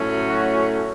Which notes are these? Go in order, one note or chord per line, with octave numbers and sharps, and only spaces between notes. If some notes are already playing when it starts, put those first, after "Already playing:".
Already playing: A2 F#3 A3 C#4
F#4